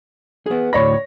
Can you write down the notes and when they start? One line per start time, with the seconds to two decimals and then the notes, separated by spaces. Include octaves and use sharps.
0.46 B3 G#4
0.73 D2 A2 C#5 D5 B5 A#6